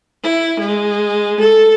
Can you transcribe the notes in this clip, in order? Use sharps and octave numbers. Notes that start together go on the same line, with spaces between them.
E4
G#3
A4